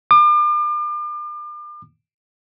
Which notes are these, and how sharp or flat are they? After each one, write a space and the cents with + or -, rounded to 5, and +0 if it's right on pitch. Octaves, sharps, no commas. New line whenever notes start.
D6 +40